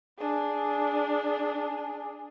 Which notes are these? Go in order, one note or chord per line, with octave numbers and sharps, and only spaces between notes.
D4 G#4